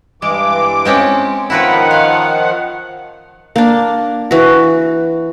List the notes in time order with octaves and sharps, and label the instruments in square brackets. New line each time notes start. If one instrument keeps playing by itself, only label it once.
[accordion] G2 E3 D6 [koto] G#3
[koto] G#3 C4 C#4
[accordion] D#3 F3 F#5 [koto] E4 A#4 B4
[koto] F5
[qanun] A#3 D4
E3 F#4